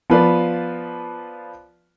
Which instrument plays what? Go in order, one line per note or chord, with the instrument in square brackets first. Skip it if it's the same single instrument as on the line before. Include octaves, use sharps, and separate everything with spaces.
[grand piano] F3 B3 F4 B4 D5